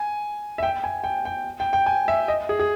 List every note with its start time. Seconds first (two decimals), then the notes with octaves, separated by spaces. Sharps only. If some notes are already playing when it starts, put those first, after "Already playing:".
Already playing: G#5
0.58 E5
0.63 G5
0.84 G#5
1.04 G5
1.25 G5
1.60 G5
1.73 G5
1.86 G#5
2.08 E5
2.28 D#5
2.49 G#4
2.59 G#4